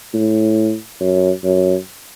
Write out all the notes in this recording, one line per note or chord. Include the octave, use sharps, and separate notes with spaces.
A2
F#2
F#2